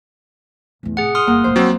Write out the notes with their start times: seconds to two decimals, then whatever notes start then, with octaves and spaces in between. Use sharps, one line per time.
0.83 A1 E2
0.97 A2 C3 G#4 F#5
1.15 C6 D#6 F6
1.27 G1 A#3 F#5
1.44 D1 A1 C5
1.56 A#1 F#3 C4